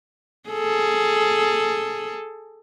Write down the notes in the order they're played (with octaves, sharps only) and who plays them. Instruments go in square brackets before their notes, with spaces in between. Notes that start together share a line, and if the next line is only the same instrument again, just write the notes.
[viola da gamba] G#4 A4